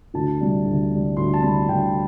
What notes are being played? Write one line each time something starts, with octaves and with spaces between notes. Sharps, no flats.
D2 A5
C3 G3
D2
C3 G3
D2 C6
A5
C3 G3 B5
D2 G5